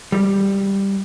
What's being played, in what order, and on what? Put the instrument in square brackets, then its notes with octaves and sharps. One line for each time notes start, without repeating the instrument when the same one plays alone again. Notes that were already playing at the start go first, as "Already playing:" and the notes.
[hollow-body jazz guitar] G3